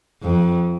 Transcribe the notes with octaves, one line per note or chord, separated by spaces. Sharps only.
F2